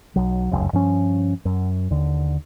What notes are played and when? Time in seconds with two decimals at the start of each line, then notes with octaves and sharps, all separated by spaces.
0.16 B1 F#3
0.51 F1 C#2 F#2
0.73 G2 F3 C#4
1.45 F#2
1.90 D#2 D3